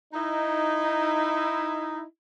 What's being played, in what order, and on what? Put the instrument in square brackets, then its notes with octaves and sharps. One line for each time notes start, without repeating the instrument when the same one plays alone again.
[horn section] D#4 E4